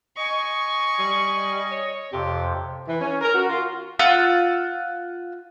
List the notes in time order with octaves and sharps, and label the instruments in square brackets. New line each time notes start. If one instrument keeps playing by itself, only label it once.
[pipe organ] D#5 [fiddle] G#5 C#6
[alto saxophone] G3
C#5
[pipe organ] F2 C3 [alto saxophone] G4
[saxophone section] E3
C#4
A#4
F#4
F4
[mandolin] F4 F#5 E6